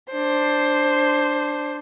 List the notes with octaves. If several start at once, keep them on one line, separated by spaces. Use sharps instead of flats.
D4 C5